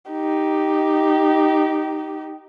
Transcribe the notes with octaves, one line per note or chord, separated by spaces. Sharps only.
D#4 G4